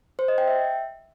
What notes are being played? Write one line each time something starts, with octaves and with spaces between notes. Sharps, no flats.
C5
D#5
G5
E5